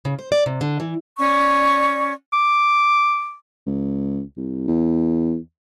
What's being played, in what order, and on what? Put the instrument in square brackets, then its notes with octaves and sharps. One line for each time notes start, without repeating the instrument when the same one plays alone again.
[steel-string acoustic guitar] C#3
C5
D5
C3
D3
E3
[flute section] C#4 D5 C#6
[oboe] D6
[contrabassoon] C#2
C2
E2